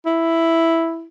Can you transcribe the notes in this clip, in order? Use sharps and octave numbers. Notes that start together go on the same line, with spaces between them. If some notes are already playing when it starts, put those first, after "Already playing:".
E4